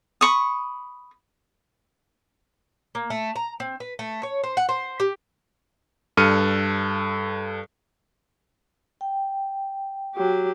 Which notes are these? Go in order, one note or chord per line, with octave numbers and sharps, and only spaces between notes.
B5 C#6 D#6
A#3
A3
A#5
C4
B4
A3
C#5
C5
F#5
C5
G4
G2 A4 F6 C#7 D#7
G5
F#3 G4